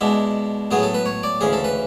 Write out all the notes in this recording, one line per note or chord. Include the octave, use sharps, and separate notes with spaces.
B2 G#3 D4 E4
A2 F#3 B3 G#4
A4
B4
C#5
D5
D2 C#3 E3 G#4
A4
B4